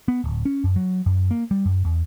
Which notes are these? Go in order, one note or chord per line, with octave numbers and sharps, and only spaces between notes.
B3
D1
C#4
F#2
F#3
F#2
A#3
G3
F#2
E2